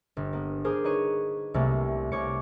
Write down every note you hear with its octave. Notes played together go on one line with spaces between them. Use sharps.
G1
A#3 B3
G#4 A#4 C5 D6 D#6
D#4 B4 C#5 D#7
C2 C3 F#3 G3 A3 A#3
C2 C#5 D6 C#7